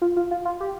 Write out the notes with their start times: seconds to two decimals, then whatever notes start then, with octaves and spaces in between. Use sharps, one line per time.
0.02 F4
0.16 F4
0.31 F4
0.45 F4
0.60 G4